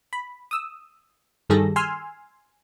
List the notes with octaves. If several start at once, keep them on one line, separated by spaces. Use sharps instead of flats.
B5
D#6 E6
G2 D#3 G3 G#4 A4 A#6
G#5 C6 E6 F6